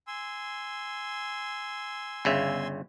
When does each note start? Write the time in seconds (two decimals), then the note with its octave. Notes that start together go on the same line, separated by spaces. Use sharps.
0.07 G#5 C6 E6
2.25 G1 C#3 E5